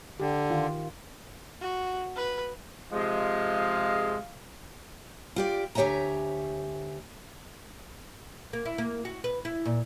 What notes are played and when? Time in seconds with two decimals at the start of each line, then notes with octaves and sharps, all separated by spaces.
0.20 D3 G4
0.50 D#3 F4
1.61 F#4
2.16 B4
2.92 C3 F3 G#3 F5
5.36 F4 G4 D5
5.75 D2 G4 C#5 E5 G#5 A#5
8.53 A#3
8.65 E4
8.78 A#3
9.05 F#4
9.24 B4
9.45 E4
9.65 A#2